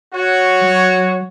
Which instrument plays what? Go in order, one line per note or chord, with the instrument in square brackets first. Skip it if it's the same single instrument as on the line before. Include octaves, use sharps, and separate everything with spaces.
[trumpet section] F#4 C#5
[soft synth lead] F#3